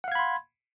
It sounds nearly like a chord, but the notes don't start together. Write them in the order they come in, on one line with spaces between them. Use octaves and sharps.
F#5 F5 G#6 B5 C6